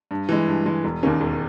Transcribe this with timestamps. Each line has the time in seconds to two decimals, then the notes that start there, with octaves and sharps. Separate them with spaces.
0.11 G2
0.29 E3 G#3
0.48 G2
0.66 E3 G#3
0.84 E1
1.03 D#2 D#3 A#3 C#4
1.21 E1